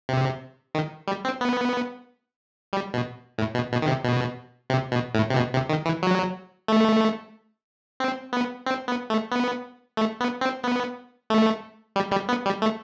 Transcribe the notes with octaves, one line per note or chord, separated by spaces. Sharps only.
C3
D#3
G3
C4
B3
G3
B2
A2
B2
B2
D#3
C3
B2
C3
B2
A2
C3
B2
C3
D#3
E3
F#3
A3
C4
B3
C4
B3
A3
B3
A3
B3
C4
B3
A3
G3
G3
B3
G3
A3